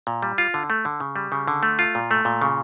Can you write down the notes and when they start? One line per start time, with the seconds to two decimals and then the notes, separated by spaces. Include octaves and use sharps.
0.07 A#2
0.23 G3
0.38 F4
0.54 D3
0.70 A3
0.85 D3
1.00 C#3
1.16 G3
1.32 C#3
1.48 D3
1.63 A3
1.79 F4
1.95 A#2
2.11 A3
2.25 A#2
2.42 C#3